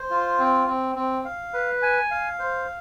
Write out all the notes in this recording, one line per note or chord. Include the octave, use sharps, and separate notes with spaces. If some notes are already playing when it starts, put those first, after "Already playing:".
Already playing: C5
F4
C4
C4
C4
F5
B4
G#5
F5
C5